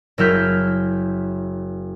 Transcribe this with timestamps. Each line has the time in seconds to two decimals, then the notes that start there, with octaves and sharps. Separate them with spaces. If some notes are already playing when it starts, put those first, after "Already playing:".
0.18 F#1 F#3 E4 F6 G6 B6